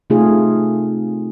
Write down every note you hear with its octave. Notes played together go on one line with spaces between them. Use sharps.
C3 A3 D#4 F4 G#4